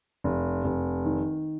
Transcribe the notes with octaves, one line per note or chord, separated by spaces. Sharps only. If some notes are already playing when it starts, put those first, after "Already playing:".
F1
F1
D#3